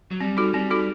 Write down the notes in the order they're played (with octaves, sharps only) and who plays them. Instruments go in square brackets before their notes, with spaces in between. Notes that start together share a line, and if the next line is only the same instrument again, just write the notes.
[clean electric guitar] F#3
[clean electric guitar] G3 [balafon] C4
[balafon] D#4 F#4 A4
[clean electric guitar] G3 [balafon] C4
[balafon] D#4 F#4 A4